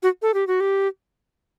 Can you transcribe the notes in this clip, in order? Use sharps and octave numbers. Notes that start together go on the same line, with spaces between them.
F#4
A4
G4
F#4
G4